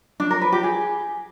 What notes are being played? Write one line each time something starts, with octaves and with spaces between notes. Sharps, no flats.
D4
A#4
B4
G4
G#4